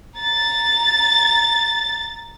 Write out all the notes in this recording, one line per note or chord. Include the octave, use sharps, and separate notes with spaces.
A#5 A6